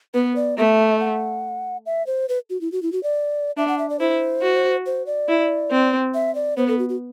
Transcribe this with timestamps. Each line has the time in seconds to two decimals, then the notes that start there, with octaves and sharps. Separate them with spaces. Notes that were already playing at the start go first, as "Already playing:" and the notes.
0.14 B3 B4
0.36 D5
0.57 A3 E5
1.00 F#5
1.86 E5
2.07 C5
2.29 B4
2.50 F#4
2.61 E4
2.72 F#4
2.83 E4
2.92 F#4
3.03 D5
3.57 D4 E5
3.68 F#5
3.78 E5
3.90 D5
3.99 E4 C5
4.42 F#4
4.86 C5
5.06 D5
5.28 E4
5.71 C4
6.14 E5
6.35 D5
6.57 B3 C5
6.68 A4
6.79 F#4
6.89 F#4